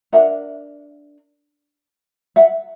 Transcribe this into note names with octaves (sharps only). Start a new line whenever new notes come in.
D4 G4 A#4 E5 F#5
E5 F#5